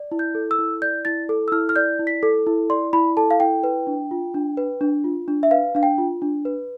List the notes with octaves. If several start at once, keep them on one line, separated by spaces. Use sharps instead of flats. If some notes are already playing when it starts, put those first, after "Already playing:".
Already playing: D5
E4
G6
A4
E6
E4
D5 G6
E4 A6
A4
E6
E4 F6
F6
D5 G6
E4
B6
A4
E4
D5 C6
E4 B5
A4 A5
F5
E4 G5
B4
D4
F4
D4
B4
D4
F4
D4
E5
B4 F5
D4 F5
G5
F4
D4
B4